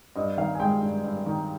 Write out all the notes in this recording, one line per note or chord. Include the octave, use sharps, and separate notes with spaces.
G2 D#5
D#3 F5
G#5
G#3 G5
G2
G2
D#3